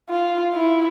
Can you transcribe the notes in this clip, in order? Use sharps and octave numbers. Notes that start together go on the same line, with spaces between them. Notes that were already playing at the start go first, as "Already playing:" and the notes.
F4
E4